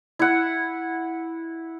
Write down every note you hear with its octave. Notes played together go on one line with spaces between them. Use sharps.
E4 F#5